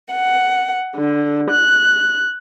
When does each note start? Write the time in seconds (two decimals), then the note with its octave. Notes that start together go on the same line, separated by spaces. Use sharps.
0.13 F#5
0.96 D3
1.50 F#6